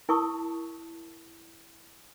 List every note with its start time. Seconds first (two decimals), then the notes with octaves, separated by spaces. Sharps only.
0.09 E4 A#4 A5 C#6 D#6